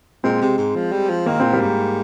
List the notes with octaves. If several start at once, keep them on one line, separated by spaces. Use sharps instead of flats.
A#2 G#3 C4
C3
G#2
F3
G3
F3
D#3 A#3
A#2 C4
G3 A#3
G#2